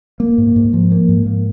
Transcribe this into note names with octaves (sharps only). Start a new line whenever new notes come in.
A#3
G#2
G#2
F3
A#3
G#2
A#3